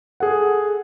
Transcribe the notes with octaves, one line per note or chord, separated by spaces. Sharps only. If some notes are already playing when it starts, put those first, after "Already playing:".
G#4 A4 F#5